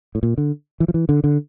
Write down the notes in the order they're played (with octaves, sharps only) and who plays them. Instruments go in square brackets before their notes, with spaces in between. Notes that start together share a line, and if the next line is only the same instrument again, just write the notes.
[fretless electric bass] A2
A#2
D3
E3
F3
E3
D3
D3